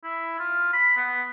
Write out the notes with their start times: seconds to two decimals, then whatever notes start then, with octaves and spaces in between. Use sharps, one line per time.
0.04 E4
0.39 F4
0.73 B5
0.97 B3